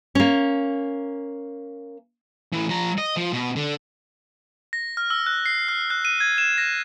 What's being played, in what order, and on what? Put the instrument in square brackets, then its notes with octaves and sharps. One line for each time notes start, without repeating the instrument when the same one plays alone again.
[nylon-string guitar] A#3 C#4
[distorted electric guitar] A2 E3
F3 A#5
D#5
F3
B2
D3
[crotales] A#6
F6
E6
F#6
C7
F6
F#6
D#7
G#6
E7
A#6